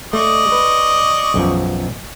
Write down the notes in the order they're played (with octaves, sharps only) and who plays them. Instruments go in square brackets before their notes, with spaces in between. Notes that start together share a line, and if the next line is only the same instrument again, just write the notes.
[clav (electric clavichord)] A3 [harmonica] D5 D#5 C#6
[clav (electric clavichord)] B4
B1 F#2 F3